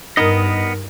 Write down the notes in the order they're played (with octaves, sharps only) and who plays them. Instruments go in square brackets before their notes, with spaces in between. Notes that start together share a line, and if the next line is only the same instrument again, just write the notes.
[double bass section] G2 [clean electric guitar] B3 D#5 [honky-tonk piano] D#4 A#4